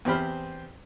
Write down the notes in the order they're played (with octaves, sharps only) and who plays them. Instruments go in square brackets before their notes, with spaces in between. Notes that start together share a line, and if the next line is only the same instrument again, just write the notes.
[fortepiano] E2 C4 G4 C5 B5 F6